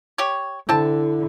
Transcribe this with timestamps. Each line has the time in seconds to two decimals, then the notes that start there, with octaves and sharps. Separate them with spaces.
0.18 G4 C#5
0.69 D3 C4 E4 A5